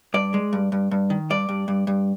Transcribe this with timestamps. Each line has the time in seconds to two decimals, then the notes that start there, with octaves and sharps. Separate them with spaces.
0.14 G2 D5
0.34 G#3
0.53 G2
0.72 G2
0.91 G2
1.10 D#3
1.30 G2 D5
1.49 G2
1.68 G2
1.87 G2